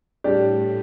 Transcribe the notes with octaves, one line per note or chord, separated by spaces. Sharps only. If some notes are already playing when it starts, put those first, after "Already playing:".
A2 G3 D4 G4 D5